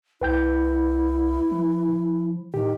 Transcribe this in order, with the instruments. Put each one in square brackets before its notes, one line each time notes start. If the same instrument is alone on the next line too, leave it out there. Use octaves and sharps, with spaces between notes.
[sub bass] C2 [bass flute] E4 [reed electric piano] B4 G5 G6
[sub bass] F3
[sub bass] A2 [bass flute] D#3 [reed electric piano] G4